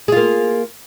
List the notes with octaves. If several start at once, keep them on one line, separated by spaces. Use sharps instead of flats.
A#3 F4 G#4